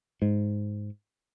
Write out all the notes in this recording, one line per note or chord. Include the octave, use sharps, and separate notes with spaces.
G#2